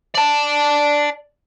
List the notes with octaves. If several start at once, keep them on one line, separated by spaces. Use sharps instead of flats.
D5 A5